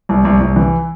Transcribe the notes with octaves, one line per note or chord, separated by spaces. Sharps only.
C2
C2
C2
E3